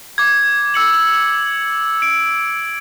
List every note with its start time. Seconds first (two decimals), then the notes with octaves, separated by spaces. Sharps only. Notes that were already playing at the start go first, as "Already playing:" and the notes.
0.18 D6 G#6
0.74 E6 C#7 F#7
2.02 D7